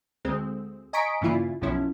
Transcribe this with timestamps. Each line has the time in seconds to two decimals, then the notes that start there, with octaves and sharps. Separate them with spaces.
0.25 D2 G#3 C4
0.93 D#5 G#5 A#5 C#6 B6 D7
1.21 G2 A#2 C#3 E3 E4 F4
1.61 B1 F#2 B2 F3 C#4 E4